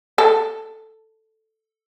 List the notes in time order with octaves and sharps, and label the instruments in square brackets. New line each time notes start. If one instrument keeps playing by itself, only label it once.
[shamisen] A4